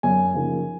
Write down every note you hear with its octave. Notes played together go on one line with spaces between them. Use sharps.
F#2 G#5
C#3 F3 A#3 D#4